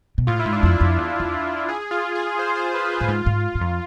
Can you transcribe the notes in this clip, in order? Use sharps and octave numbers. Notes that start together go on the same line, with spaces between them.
B2
A2 F4
E4
G#2
D4
F2 E4
F2
E2
E2
G#4
F4
G#4
C5
C5
B4
G#4
A2
G#2 F4
G#2
G#2
F2